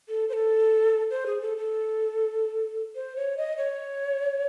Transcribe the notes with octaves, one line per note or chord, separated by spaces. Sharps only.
A4
C5
A4
C5
G#4
A4
A4
C5
C#5
D#5
C#5